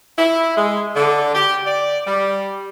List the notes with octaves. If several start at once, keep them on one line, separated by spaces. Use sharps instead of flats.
E4
G#3
D3
G4
D5
G3